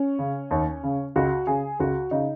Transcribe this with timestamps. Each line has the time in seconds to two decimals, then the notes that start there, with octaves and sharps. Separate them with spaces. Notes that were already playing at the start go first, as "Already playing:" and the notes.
Already playing: C#4
0.19 C#3
0.51 D#2
0.83 C#3
1.16 C#2 F#4
1.47 C#3 G#4
1.80 C#2 F#4
2.11 C#3 D#4